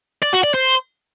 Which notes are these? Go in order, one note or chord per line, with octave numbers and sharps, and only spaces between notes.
D5
F#4
D5
C5